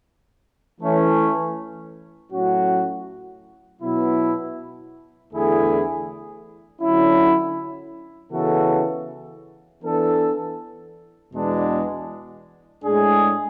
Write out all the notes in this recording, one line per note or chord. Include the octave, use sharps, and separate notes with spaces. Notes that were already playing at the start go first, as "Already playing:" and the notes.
E3 A3 C#4
A2 F#3 C#4 F#4
B2 F#3 B3 E4
E2 D3 A3 E4 G#4
D3 F#3 C#4 E4
C#3 E3 B3 F#4 A4
E3 B3 D4 A4
E2 B2 G#3 D4
A2 G#3 D4 G#4